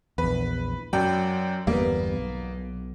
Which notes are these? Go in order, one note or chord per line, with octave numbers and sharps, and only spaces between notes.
A#1 E2 B4
F#2 F#3 D5 G5
G1 E2 G3 A#3 B3
B1